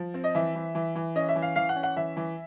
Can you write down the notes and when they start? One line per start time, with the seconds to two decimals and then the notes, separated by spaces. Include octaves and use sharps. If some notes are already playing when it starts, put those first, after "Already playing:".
Already playing: F3
0.14 C4
0.24 D#5
0.35 E3 E5
0.55 E3
0.75 E3
0.95 E3
1.16 C#4 D#5
1.29 E5
1.36 E3
1.42 F5
1.56 E3 F5
1.69 F#5
1.76 C#4
1.83 F#5
1.96 E3 E5
2.17 E3